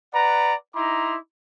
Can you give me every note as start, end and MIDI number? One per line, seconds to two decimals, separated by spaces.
0.14 0.54 71
0.14 0.54 74
0.14 0.54 78
0.14 0.54 82
0.75 1.17 63
0.75 1.17 64
0.75 1.17 82
0.75 1.17 84
0.75 1.17 86